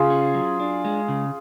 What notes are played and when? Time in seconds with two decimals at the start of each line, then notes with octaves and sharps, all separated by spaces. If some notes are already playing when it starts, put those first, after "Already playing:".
Already playing: C#3 F4 G#4
0.10 C#4
0.35 F#3
0.60 D4
0.85 G#3
1.08 C#3